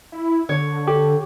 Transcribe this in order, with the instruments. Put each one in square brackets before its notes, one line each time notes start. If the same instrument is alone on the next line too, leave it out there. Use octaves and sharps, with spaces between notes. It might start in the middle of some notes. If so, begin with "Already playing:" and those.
[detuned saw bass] E4
[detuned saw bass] D3 [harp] C#5
[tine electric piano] G4 [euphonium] A4